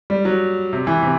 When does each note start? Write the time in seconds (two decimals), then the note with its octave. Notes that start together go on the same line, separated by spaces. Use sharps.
0.10 G3
0.25 F#3
0.73 C3
0.87 E3
1.02 C3